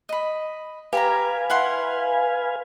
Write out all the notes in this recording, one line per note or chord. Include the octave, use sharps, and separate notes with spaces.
D#5 B5
G4 A#4 B4 F5 G#5 A#5
E4 F#5 C6